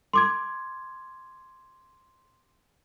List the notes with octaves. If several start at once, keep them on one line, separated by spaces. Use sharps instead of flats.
C6 D6 G#6